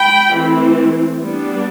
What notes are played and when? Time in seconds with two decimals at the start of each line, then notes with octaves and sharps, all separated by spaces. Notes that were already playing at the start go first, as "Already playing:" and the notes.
Already playing: G5 B5
0.31 E3 A3 C4
1.20 G3 B3 D4